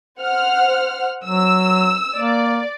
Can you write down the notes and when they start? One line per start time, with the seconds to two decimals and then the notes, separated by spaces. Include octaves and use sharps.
0.20 C5 F#5 F6
1.25 F#3 E6
2.17 A#3 D5